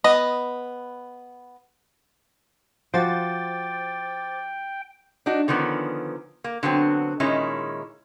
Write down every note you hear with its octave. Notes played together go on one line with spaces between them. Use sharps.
B3 D#5
F3 F#4 C5 G5 D6 A6
D4 D#4 F#4
D3 D#3 F3 B3 C#4
A#3
D3 F#3 B3 C4
A#2 D#3 G#3 C#4 E4